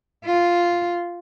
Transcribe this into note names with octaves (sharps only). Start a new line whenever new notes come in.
F4